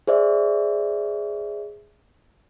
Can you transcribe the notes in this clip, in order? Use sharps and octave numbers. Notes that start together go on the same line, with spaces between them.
G#4 C5 D5 E5